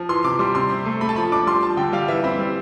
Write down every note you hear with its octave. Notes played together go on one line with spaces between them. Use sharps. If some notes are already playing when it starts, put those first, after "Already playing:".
Already playing: F3
E3 C6
C3 D6
G3 C6
C3 C6
C4
A3
A3 B5
A5
F3 B5
D4 D6
G3 C6
F3 A5
D3 G5
G3 F5
E3 E5
C4 B5
G3